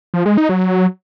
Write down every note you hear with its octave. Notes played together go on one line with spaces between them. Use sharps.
F3
G#3
D#4
F#3